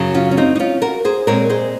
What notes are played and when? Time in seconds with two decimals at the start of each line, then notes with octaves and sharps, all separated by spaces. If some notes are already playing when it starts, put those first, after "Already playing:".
Already playing: F#2 C#3 F#3
0.14 C#4 F4
0.31 C#4
0.37 C4 D#4
0.55 D#4
0.59 C#4 F4
0.82 F#4 A#4
1.05 G#4 C5
1.27 A#2 G#3 C4 A#4 C#5
1.50 G#4 C5